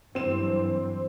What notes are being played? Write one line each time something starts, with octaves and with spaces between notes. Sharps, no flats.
G2 E3 F#3 C4 E7